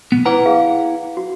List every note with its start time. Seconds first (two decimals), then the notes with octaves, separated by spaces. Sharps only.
0.12 B1 F3 B3
0.25 E4 B4 F#5 A#5 D6
0.46 G#4 F5
1.17 F#4